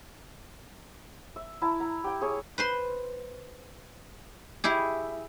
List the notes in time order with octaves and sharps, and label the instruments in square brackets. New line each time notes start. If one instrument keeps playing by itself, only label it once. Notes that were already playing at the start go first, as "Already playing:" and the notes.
[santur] E5
E4 A5 A#5
A#5
G4 G5
G#4 C#5 E5
[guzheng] B4 C5 C6
E4 G4 G#4